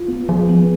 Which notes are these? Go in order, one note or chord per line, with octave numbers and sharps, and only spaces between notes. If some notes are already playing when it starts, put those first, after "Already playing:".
Already playing: F4
B3
F3 G#4
B3